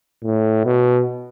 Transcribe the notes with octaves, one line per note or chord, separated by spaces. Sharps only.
A2
B2